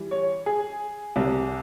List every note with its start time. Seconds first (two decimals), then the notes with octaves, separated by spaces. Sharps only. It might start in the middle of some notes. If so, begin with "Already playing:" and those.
Already playing: E3 G3
0.11 C#5
0.46 G#4
1.16 C2 C3 G3